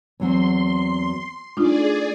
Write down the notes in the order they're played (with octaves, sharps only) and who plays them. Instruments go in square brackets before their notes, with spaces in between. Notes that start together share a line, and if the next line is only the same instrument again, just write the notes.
[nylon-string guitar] E2 F#3 C4 [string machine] C6
[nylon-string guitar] A3 [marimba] D4 D#4 F4 [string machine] G#4 D5